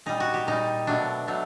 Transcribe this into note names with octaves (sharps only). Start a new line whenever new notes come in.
A#2 G3 D#4
F#4
G4
A#2 G3 D#4
B2 F#3 A3 D4
B2 F#3 A3